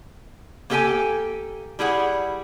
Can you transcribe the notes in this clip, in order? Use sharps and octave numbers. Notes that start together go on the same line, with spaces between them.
A#3 B3 G4 A4 G5 G#5
G3 E4 G#4 F#5